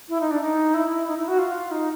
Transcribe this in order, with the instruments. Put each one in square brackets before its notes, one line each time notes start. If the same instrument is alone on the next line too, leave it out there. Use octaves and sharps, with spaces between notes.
[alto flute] E4
D#4
D4
D#4
E4
D#4
E4
F#4
F4
D#4